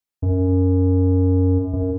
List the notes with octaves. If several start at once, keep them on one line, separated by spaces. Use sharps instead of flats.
F#2
F#2